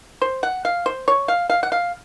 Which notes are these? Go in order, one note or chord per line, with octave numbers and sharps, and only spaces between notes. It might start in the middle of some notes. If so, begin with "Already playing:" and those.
C5
F#5
F5
C5
C#5
F5
F5
F#5
F5